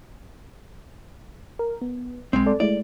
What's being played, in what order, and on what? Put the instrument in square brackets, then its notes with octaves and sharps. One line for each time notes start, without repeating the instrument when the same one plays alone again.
[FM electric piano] A#4
B3
[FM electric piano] B1 [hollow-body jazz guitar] G#3 C4
[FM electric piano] A4 D5
[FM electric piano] G#3 A3 E4 [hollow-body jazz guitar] D5